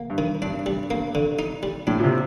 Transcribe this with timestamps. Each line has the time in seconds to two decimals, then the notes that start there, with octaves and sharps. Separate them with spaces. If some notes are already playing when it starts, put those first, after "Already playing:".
Already playing: A#3
0.10 G2
0.18 D#3
0.42 G2 D4
0.66 G2 G3
0.90 A#3
1.15 D3
1.39 D#4
1.63 G3
1.87 A2 D4
2.00 A#2
2.04 C3